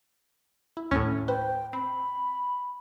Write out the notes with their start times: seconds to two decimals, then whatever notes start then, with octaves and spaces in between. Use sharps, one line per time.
0.77 E4
0.91 D#2 A2 C#4
1.28 B4 C5 G5
1.73 C4 B5